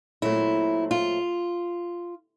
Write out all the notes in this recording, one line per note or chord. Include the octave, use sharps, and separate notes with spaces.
A#2 F#3 A3 C4 E4
F4